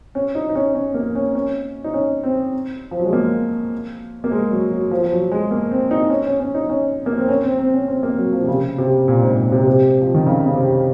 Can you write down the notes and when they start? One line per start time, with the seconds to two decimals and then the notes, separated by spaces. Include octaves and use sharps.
0.15 C#4
0.35 D#4
0.49 D#4
0.55 C#4
0.75 C#4
0.94 A#3
1.15 C#4
1.35 C#4
1.84 D#4
1.94 C#4
2.23 C4
2.91 F3
2.99 F#3
3.05 G#3
3.13 A#3
4.24 A#3
4.32 G#3
4.51 F#3
4.72 F#3
4.91 F3
5.03 F3
5.11 F#3
5.31 G#3
5.51 A#3
5.71 C4
5.91 D#4
6.10 C#4
6.26 C#4
6.40 C#4
6.54 D#4
6.70 C#4
7.06 A#3
7.18 C4
7.28 C#4
7.43 C4
7.59 C4
7.74 C#4
7.88 C4
8.03 A#3
8.18 F#3
8.33 F3
8.44 C3
8.48 C#3
8.78 C3
9.08 A#2
9.22 G#2
9.37 A#2
9.52 C3
9.67 C3
10.01 F3
10.14 D#3
10.26 C#3
10.46 C#3
10.55 C3